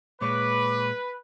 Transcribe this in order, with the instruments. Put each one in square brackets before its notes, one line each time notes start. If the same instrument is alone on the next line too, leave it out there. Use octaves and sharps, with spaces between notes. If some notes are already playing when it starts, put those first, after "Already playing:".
[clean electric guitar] A#2 G#3 C#5 [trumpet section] B4 [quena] D6